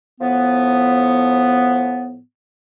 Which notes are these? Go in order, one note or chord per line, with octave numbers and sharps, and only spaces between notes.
A2 F3 B3